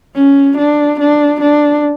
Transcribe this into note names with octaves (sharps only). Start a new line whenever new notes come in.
C#4
D4
D4
D4